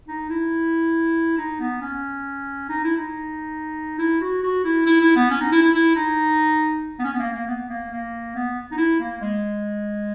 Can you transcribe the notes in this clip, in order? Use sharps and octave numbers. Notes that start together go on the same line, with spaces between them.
D#4
E4
D#4
B3
C#4
D#4
E4
D#4
E4
F#4
F#4
E4
E4
E4
B3
C#4
D#4
E4
E4
E4
D#4
B3
C#4
B3
A#3
A#3
B3
A#3
A#3
B3
D#4
E4
A#3
G#3